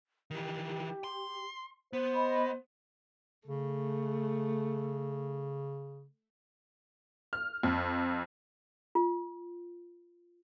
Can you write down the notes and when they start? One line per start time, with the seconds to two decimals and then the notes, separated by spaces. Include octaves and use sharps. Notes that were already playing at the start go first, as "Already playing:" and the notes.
0.31 D#3 E3 G4
1.04 C6
1.93 B3 C5
2.14 D#5 B5
3.48 C#3 A3
7.33 F6
7.63 F2
8.95 F4